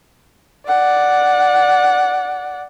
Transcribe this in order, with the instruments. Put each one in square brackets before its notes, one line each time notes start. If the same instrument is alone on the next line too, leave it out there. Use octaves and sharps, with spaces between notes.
[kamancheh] D5 F#5